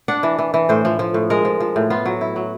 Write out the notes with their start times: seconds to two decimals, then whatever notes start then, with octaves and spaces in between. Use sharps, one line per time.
0.08 D4 F#5
0.23 E3
0.39 E3
0.54 E3
0.69 A2 C5
0.85 F3
0.99 F3
1.14 A2
1.30 G#3 A#4
1.45 F3
1.60 F3
1.76 A2
1.90 B3 F4
2.06 F#3
2.21 E4
2.36 F#3